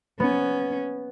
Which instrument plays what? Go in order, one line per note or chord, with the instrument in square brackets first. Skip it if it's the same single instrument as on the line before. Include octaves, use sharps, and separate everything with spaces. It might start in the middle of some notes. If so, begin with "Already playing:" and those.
[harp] B3 [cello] C#4